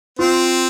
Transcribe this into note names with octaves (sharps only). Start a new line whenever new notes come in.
C4 F4